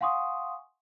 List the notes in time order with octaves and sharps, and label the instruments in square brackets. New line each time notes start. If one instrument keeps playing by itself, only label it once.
[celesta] F5 F#5 G#5 C6 C#6 D#6